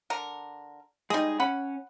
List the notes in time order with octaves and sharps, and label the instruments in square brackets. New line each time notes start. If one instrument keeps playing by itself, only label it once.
[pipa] D3 A#4
[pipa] G3 G#4 [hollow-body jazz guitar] G#3 D#4
[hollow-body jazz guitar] C#4 [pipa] F#5 B5